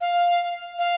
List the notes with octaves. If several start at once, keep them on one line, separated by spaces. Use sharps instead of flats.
F5
F5